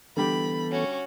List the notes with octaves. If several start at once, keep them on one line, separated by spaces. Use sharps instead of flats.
D3 E3 G3 B3 G4 A4 B5
C#4 F#4